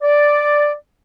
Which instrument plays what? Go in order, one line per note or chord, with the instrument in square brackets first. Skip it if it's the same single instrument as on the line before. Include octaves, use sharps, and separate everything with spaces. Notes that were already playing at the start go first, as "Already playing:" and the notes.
[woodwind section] D5